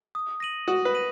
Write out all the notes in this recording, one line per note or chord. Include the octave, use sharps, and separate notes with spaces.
D#6
A#6 D#7 F#7
F#4 D#6
B4
A#6 D#7 F#7